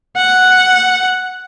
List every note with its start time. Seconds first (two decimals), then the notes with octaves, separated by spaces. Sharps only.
0.16 F#5